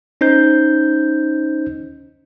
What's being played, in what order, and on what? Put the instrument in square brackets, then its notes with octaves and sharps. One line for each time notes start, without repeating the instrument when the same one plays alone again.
[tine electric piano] C#4 D#4 C5 G6